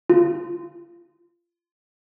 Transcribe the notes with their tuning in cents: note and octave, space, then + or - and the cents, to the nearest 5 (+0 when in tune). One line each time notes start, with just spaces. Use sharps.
F4 -25